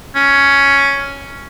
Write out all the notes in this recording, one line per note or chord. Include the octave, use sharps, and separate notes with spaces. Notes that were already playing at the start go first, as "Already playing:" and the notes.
C#4